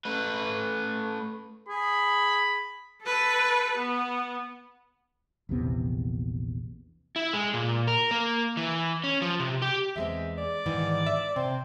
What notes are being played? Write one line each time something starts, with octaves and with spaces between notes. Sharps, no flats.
A3 B4
G#4 B5
A4 B4
B3
A#1 E2 C3 B3
E4
G#3
A#2
A#4
A#3
E3
C#4
F3
C3
G4
E2 G#3 C4 E5
D5
G#2 D#3 E3
E5
C3 C4